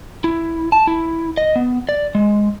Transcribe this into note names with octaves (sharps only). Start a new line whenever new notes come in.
E4
A5
E4
D#5
B3
D5
G#3